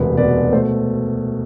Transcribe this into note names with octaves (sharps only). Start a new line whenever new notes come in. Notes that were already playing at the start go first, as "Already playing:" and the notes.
Already playing: E1 D2 C3 B4
B2 B4 D5
A3 C5